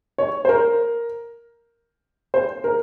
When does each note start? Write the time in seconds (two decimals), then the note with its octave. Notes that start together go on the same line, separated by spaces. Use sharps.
0.18 C#5
0.45 C5
0.49 A#4
2.34 C5
2.64 A#4